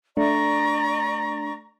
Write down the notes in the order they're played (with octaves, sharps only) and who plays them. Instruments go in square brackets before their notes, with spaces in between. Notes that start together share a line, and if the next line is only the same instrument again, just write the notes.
[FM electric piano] A3 D4 [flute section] D5 A#5 C#6